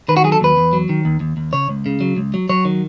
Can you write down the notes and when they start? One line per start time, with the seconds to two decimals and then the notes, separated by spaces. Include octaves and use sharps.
0.08 D#3 B4
0.17 F#4
0.24 F#3 G#4
0.32 A4
0.41 D#2 B4
0.57 E2
0.73 F#3
0.89 D#3
1.05 D#2
1.20 D#2
1.37 D#2
1.53 C#3 C#5
1.69 C#2
1.86 C#3
2.01 F#3
2.17 C#2
2.34 F#3
2.49 F#3 C#5
2.65 D#3